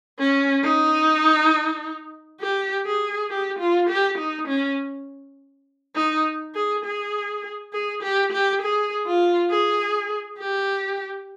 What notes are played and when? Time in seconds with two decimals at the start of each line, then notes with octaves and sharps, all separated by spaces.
0.19 C#4
0.63 D#4
2.41 G4
2.86 G#4
3.30 G4
3.59 F4
3.89 G4
4.18 D#4
4.48 C#4
5.95 D#4
6.55 G#4
6.85 G#4
7.73 G#4
8.03 G4
8.32 G4
8.62 G#4
9.06 F4
9.50 G#4
10.39 G4